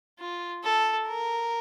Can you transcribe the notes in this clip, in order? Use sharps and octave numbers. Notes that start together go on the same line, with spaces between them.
F4
A4
A#4